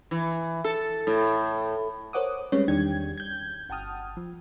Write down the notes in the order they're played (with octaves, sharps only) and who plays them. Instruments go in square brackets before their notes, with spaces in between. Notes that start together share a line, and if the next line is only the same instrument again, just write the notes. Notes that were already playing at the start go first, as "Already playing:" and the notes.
[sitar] E3
A4
A2
[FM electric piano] A#4 C5 C#5 F#5 D6 D#6
G3 G#3 C4 C#4 B4 C#5
E2 D#3 G3 D4 G5 G#6
G6 G#6
G1 F#5 G5 A5 D#6 F6
F3